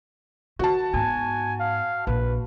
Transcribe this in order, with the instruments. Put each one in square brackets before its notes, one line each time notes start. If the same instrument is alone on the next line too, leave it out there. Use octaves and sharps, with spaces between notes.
[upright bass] D#3 [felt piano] F#4 A5
[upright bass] G#2 B3 [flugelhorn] G#5
[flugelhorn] F5
[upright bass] A#1 [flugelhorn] B4